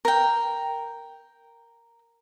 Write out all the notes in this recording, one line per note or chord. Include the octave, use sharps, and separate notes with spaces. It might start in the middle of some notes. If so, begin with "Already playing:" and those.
A#4 G5